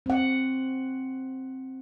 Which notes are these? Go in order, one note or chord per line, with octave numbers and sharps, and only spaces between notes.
C4 F#5